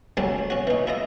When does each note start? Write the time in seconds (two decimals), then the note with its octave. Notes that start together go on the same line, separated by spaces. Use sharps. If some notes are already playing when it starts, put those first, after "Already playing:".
0.17 D2 F#3 G3 C#4 D4
0.50 C#4 F#4
0.67 E3 D#4
0.87 E4 F4 D#5